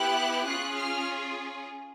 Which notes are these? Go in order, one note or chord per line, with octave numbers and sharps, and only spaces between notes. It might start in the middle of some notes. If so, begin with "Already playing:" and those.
Already playing: B3 E4 G4 F#6
C#4 F4 G#4 F#6
F6